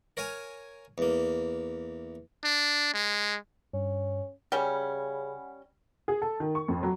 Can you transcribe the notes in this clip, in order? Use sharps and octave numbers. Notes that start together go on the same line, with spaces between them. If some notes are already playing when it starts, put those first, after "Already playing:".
A#4 C#5 F5 G#5
E2 A#3
D4
G#3
G2 C#4
C#3 G3 C#4 F#5 G#5 B5
G#4
A4
D#3
C#6
F2
F#3